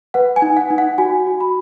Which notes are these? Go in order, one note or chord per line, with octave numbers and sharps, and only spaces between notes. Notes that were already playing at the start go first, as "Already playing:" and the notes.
B4 F#5
G#5
D#4
F#5
D#4
F#5
F#4 G#5
F#4
B5